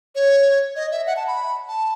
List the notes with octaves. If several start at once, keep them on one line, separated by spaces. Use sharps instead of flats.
C#5
D#5
E5
F#5
A5
B5
A5